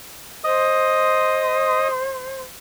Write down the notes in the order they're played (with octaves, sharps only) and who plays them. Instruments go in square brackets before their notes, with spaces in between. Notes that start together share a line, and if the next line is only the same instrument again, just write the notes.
[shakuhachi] C5 [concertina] D#5 D#6